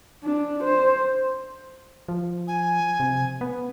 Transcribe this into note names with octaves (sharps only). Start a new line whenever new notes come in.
D4
C5
F3
G#5
C3
B3